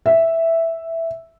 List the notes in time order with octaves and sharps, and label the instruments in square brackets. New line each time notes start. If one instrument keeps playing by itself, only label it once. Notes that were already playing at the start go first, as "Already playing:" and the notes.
[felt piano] E5